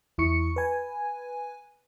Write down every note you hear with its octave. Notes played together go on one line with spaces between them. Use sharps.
E2 E4 C#6 C#7
B4 G#5